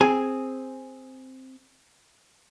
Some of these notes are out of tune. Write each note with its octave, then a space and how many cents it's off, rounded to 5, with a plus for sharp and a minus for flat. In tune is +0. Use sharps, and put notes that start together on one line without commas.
C4 +0 G#4 +0 G#5 +0